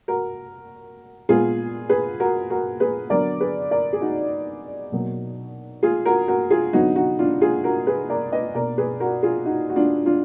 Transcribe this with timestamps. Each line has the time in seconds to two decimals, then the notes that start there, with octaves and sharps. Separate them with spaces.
0.08 F#4 A#4
1.29 A#2 G#3 B3 F4 G#4
1.89 G#4 B4
2.20 F#4 A#4
2.50 F#4 A#4
2.80 G#4 B4
3.10 D3 F#3 B3 A#4 D5
3.40 G#4 B4
3.71 A#4 D5
3.93 G#4
4.01 D#4 F#4
4.92 B2 F#3 A#3
5.83 F4 G#4
6.05 F#4 A#4
6.28 F#4 A#4
6.50 F4 G#4
6.73 D3 F#3 B3 D#4 F#4
6.96 D#4 F#4
7.19 D4 F4
7.41 F4 G#4
7.64 F#4 A#4
7.87 G#4 B4
8.10 A#4 D5
8.32 B4 D#5
8.54 B2 A#3 A#4 D5
8.78 G#4 B4
9.00 F#4 A#4
9.23 F4 G#4
9.45 D#4 F#4
9.69 F#4
9.76 D4 F4
10.06 D4 F4